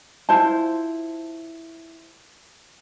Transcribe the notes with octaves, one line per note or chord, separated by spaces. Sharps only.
E4 F4 C5 A5